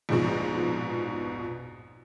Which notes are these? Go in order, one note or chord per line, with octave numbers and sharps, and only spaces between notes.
A#1 F2 G#2 B2 F3